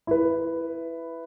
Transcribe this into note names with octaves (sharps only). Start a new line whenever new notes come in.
E4 B4